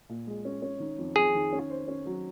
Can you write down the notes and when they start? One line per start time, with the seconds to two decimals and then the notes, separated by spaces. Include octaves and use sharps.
0.09 A#2
0.27 G#3
0.45 C#4
0.62 C#4
0.80 D#3
0.98 F2
1.16 F2 G#4
1.35 D#3
1.53 C#4
1.70 C5
1.88 C#4
2.06 F#3